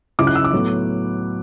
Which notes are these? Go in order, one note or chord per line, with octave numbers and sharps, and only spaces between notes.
C#2 C#3 F#3 C#4 E4 D6
F#6
E6
D6
A2 F#3 B3